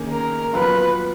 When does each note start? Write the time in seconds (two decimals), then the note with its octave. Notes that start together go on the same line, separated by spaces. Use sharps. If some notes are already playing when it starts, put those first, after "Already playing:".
Already playing: D#3 A#3 C#4 G#4
0.12 A#4
0.53 F#2 F3 B3 F4 B4